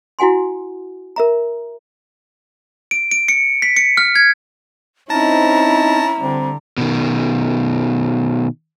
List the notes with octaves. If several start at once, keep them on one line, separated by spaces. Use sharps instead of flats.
E4 F#4 F#5 G#5 C6
A#4 E5 A#5
D7
D7
C#7
B6
C#7
F6
G#6
C4 C#4 D#4 E4 A5 A#5 A#6
D3 G3 C4
B2 D#3